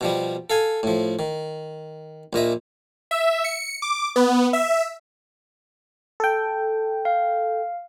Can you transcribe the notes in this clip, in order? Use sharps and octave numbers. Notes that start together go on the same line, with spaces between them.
B2 F3 G3
A4 F5 G#5
A2 F3
D#3
A#1 A#2 D#5 E5
E5
C#7
D6
B3
E5
A4 G5
F5